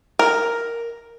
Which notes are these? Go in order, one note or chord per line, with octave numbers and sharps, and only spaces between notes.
A#4